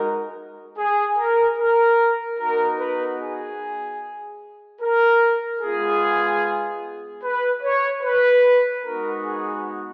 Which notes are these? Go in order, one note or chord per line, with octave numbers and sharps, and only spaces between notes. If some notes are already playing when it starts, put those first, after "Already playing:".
Already playing: G#3 D#4 F#4 A#4
G#4
A#4
A#4
B3 D#4 F#4 A#4
B4
G#4
A#4
G#3 B3 F4 G#4
B4
C#5
B4
G#3 B3 D#4 F#4 A#4
G#4